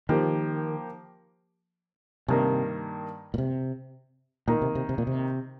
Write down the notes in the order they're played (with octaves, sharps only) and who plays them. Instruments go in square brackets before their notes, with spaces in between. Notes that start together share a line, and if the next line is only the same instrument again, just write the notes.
[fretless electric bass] D#3 [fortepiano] F3 A#3 G4
[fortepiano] G2 D#3 A#3 [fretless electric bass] C3
[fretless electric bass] A#2
C3
[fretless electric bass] A#2 [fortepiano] D#3 A#3 D#4
[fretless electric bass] C3
C3
C3
A#2
C3